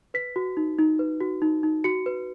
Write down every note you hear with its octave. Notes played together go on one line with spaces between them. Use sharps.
B4 B6
F#4
D#4
D#4
B4
F#4
D#4
D#4
F#4 C#7
B4